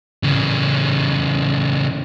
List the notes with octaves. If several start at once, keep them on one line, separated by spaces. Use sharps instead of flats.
C#3 E3